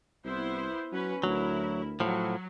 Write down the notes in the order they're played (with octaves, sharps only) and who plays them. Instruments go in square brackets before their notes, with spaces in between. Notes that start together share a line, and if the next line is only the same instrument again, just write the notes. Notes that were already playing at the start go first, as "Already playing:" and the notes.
[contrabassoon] C2 [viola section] B3 E4 C5
[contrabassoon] F#3 [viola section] C#4 B4
[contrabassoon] D2 [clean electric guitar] F#3 [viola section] E4 A#4
[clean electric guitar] A2 F3 [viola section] F#3